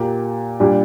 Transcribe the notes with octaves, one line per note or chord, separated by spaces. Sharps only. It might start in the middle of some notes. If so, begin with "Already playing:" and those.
Already playing: A#2 A#3 G4
A#2 G3 D4 G4